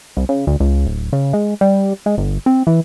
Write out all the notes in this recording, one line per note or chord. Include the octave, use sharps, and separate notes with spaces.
C2
C#3
D2
C#2
D1
C#3
G#3
G3
G#3
G1
C4
E3